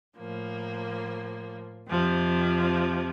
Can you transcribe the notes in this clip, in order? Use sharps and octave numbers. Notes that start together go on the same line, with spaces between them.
A2 F3 A#3
F2 C3 F3